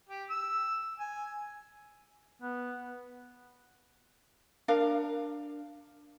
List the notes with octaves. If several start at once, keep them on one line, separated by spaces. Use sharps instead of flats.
G4
E6
G#5
B3
D4 A#4 F5